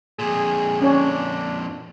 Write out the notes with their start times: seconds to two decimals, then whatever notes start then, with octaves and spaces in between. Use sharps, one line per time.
0.19 F2 A#2 G#4
0.82 C#4 D4 C#5 G#5